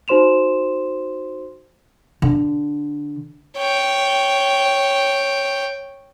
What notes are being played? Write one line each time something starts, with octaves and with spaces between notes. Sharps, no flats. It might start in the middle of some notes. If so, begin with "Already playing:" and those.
D#4 F#4 C5 C6 E7 F7
D3
C#5 G5